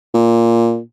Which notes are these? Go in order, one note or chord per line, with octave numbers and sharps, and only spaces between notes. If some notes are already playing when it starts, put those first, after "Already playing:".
A#2